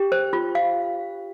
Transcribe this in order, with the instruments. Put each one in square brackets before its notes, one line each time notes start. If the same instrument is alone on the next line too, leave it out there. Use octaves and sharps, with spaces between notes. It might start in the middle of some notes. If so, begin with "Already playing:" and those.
Already playing: [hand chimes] G4
[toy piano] C5
F4
F5